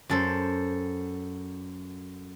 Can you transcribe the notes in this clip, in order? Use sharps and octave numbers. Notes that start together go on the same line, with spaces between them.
F#2 A4 C5